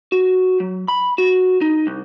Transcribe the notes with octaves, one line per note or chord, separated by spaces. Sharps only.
F#4
F#3
B5
F#4
D#4
C2